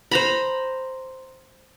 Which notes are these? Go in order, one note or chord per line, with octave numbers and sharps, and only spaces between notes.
C5 A#5 B5